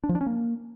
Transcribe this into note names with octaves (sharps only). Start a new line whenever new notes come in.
D4
F3
D4
C#4
A#3